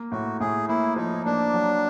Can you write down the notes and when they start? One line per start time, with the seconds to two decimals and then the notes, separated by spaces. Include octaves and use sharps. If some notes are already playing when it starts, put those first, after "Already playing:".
Already playing: A#3
0.12 A2 F#4
0.40 A2 G#4
0.68 A#3 E4
0.96 F3 D#4
1.25 A#3 D4
1.54 F#3